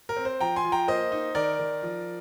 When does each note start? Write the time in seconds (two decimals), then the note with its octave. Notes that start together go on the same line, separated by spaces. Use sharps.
0.09 A#4
0.16 C4
0.25 C5
0.40 F3 G5 A#5
0.56 G#5 C6
0.64 F3
0.72 G5 A#5
0.88 A#3 C5 D#5
1.12 D#4
1.35 D#3 A#4 D5
1.59 D#3
1.83 F3